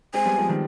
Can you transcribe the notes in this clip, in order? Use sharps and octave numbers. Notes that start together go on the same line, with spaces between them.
G#3 C4 G#5
G3 B3
F3 G#3
D#3 G3